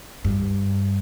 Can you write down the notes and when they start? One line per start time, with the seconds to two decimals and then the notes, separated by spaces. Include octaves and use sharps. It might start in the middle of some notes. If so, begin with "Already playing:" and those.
0.24 G2